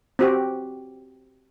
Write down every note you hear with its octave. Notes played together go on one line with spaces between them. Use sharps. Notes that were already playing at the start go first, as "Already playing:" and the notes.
C4 F#4 G4